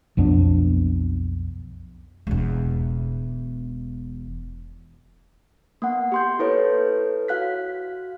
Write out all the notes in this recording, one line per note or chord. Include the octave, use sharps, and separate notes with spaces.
B1 F2 B3 D4
E1 E2
A#3 B3 F#5
G4 C6 G6
E4 A4 B4 C#5
F#4 F5 F#6 B6